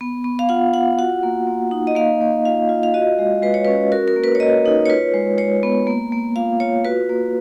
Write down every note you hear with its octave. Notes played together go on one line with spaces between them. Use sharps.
B3
B3
F5
F4 F#5
F4 F#5
F#4 F#5
A#3
A#3
D#4
D#5
A#3 F5
A#3
F4 F5
F4
F5
F#4 D#5
G#3
G#3 B4
C#5
C#4 B4
F#4 A#4
A#4
A#3
B4
C#5
A#3 D#5
D#4
C#5
F4 B4
G#3
G#3 C#5
B3
A#3
A#3
F4 F5
F4 C#5
F#4 B4
A#3